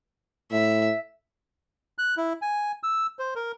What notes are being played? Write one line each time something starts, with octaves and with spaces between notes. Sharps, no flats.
A2 E5
F#6
E4
G#5
E6
C5
A#4